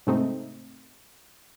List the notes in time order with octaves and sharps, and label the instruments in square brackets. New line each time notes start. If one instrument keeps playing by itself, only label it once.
[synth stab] G#2 C3 A3 C4 D#4